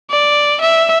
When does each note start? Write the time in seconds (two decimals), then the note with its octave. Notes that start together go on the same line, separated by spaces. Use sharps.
0.10 D5
0.61 E5